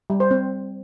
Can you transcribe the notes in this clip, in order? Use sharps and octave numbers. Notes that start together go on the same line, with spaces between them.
G3
C5
C4